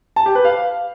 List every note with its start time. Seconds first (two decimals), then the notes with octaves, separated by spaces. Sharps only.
0.16 A5
0.26 G4
0.35 B4
0.45 F5